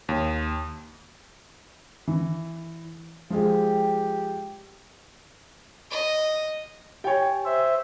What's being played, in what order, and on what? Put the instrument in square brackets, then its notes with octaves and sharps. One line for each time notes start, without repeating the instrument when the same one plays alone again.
[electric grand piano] D#2
[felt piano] E3
[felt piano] F3 G#3 [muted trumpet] G4
[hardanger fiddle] D#5
[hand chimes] G4 G#5 [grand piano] C#5 G5
[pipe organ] C5 E5